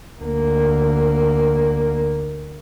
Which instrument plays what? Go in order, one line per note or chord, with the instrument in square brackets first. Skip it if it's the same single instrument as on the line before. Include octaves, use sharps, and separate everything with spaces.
[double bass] D2 A#3